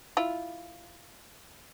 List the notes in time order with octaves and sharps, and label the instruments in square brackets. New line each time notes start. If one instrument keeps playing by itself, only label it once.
[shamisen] E4 F4